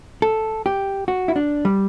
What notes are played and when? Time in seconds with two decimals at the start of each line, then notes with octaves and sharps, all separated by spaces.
0.22 A4
0.66 G4
1.08 F#4
1.28 E4
1.36 D4
1.65 G3